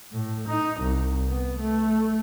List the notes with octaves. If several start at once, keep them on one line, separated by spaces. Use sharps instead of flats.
A2
D#4
C2
B3
A3